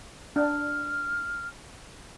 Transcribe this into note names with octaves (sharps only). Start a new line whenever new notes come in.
D4 F6